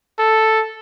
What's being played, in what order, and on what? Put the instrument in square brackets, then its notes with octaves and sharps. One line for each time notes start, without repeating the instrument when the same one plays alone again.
[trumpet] A4